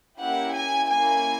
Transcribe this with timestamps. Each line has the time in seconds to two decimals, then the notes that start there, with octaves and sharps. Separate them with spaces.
0.20 A#3 C#4 E4 G4 F#5
0.54 G#5
0.90 A#3 C#4 E4 G#5